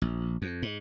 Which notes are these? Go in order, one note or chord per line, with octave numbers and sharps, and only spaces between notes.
A#1
F2
G#2